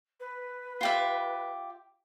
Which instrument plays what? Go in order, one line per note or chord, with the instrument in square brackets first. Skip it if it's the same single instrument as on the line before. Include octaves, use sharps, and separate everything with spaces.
[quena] B4
[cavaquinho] F4 G4 E5